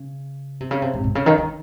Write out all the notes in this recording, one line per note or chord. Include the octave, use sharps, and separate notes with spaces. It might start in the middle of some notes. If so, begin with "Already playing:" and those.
Already playing: C#3
C3
C#3
C3
G#2
C3
C#3
D#3
D#3